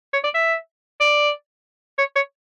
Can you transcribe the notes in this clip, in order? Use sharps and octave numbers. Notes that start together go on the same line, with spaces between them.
C#5
D5
E5
D5
C#5
C#5